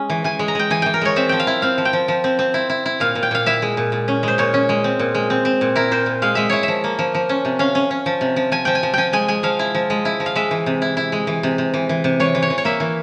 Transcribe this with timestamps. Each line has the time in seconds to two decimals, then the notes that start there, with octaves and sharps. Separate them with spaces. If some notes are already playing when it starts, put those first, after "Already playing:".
Already playing: G#3 C#4
0.10 E3
0.24 E3 G#5
0.39 G#3
0.48 A#5
0.55 G#3 G5
0.70 E3 G#5
0.82 E3 G5
0.94 A#4
1.01 G#3 C#5
1.16 C4 E5
1.29 F3 G5
1.40 F5
1.47 E4
1.62 C4 F5
1.78 F3
1.85 G5
1.93 F3
2.08 F3
2.24 C4
2.39 C4
2.54 E4
2.69 E4
2.86 E4
3.00 A#2 F5
3.15 A#2
3.23 G5
3.31 A#2 F5
3.46 E4 E5
3.62 G#3
3.77 A#2
3.92 A#2
4.08 C#4
4.23 G#3 C5
4.38 A#2 C#5
4.54 C#4
4.69 G#3
4.84 C4
4.99 A#2
5.14 G#3
5.30 C4
5.45 C4
5.61 A#2
5.76 E4 A#4
5.91 A#2 C5
6.06 A#2
6.22 G#3 F5
6.35 G#3 E5
6.50 E4 C#5
6.63 F3 E5
6.84 A#3
6.99 F3
7.15 F3
7.29 C#4
7.45 C3
7.59 C#4 F5
7.75 C#4
7.91 C#4
8.06 F3
8.21 C3
8.36 F3
8.52 F3 G#5
8.65 F3 G5
8.75 G#5
8.83 F3
8.94 F3 G5 G#5
9.13 G#3 G#5
9.28 G#3 G#5
9.43 F3 F5
9.59 E4
9.75 F3
9.90 G#3
10.05 E4
10.20 F3
10.26 F5
10.35 G#3 E5
10.51 E3
10.66 C3
10.82 E4
10.97 E4
11.12 G#3
11.27 E3
11.43 C3
11.58 C3
11.74 E3
11.89 E3
12.04 C3
12.20 E3 C#5
12.35 E3
12.42 C#5
12.50 E3
12.58 C#5
12.65 A#3 E5
12.80 E3